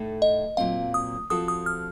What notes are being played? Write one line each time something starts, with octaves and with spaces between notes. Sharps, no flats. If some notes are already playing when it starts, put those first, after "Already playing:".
Already playing: A2 A3 D#4 A4
D#5
A#2 F#3 C4 F5
D#6
F3 C4 F#4 A4 D#6
D#6
F6